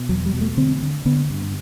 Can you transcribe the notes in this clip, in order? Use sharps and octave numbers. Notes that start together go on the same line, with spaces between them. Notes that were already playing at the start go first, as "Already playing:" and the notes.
Already playing: B2
E2 F#3
G3
B2
A3
D3 C4
D3
D3 B3
G2